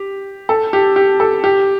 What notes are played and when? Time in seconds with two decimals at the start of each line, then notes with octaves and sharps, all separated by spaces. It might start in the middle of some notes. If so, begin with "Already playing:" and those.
Already playing: G4
0.49 A4
0.73 G4
0.96 G4
1.20 A4
1.44 G4